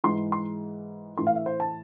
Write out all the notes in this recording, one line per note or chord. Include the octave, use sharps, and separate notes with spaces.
G#2 E3 G#3 C6
C6
A2 E3 A3 C6
F5
E5
C5
A5